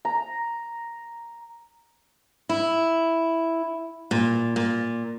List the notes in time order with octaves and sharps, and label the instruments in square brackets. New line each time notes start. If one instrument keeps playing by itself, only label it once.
[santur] A#5
[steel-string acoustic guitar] E4
A#2
A#2